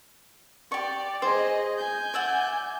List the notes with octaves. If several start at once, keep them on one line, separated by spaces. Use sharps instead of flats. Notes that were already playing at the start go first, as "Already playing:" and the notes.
G4 D5 C#6
G#4 C5 D#5
G#5 G6
D5 E5 F#5